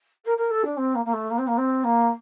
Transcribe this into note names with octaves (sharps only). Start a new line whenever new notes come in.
A#4
A#4
A4
D4
C4
A#3
A#3
A3
A#3
C4
A#3
C4
A#3